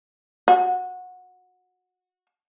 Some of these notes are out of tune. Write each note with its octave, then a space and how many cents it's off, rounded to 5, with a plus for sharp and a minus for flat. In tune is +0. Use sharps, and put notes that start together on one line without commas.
F#4 -20